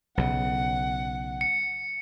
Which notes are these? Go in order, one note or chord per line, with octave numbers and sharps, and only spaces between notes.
B1 C#3 F#5
C#7